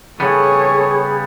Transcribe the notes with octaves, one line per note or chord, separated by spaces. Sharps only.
C#3 G3 B3 G#4 A4 C#5